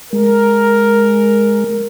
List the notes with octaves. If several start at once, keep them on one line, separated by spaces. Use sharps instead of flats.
G#3 A#4